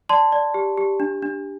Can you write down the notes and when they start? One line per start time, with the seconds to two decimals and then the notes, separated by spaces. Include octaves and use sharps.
0.09 D5 A5 C6
0.32 D5
0.54 G4
0.77 G4
1.00 D4
1.22 D4